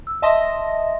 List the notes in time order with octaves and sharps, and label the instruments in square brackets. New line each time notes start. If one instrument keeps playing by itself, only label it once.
[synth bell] E6
D#5 E5 A5 C6 D#6 A#6